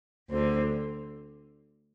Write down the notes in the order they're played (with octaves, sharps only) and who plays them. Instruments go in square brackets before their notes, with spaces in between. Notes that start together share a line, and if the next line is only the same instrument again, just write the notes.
[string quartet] D2 D3 C4